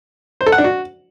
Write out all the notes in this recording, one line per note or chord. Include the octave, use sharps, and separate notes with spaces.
C5
A4
F#5
D4
F#4